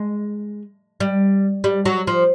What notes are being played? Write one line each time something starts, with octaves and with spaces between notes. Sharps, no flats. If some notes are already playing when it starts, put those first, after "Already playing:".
Already playing: G#3
G3
G3
F#3
F3